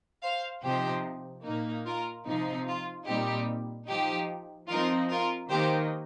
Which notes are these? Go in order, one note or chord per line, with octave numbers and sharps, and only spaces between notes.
C5 F5
C3 F3 D#4 G4 C5
A#2 A#3 D#4
F4 A#4
C3 F3 C4 D#4
F4
A#2 G3 C4 D#4 G4
F3 D#4 G4
F3 C4 D#4 F4 A#4
F4 A#4
D#3 A#3 D#4 G4 C5